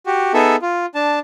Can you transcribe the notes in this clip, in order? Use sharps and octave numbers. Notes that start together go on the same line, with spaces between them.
F#4 G4
B3 D#4 G#4 A4 E5
F4
D4 A5